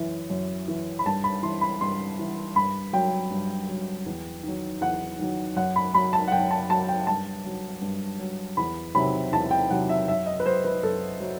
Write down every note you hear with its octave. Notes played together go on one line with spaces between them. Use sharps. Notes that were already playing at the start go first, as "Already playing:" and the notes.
Already playing: F#2 E3
F#2
E3
B5
G2 A5
B5
E3 C6
B5
G2 C6
E3
G2 B5
F#3 G5
G2
F#3
E2
D#3 F#3
E2 F#5
D#3 F#3
F#2 F#5
B5
F#3 B5
A5
F#5
F#2 G5
A5
F#3 A5
G5
G2 A5
F#3
G2
F#3
E2 B5
C3 D#3 F#3 B5
E2 A5
G5
C3 D#3 F#3 F#5
E5
F#2 E5
D#5
B4
F#3 C5
B4
F#2 A4
F#3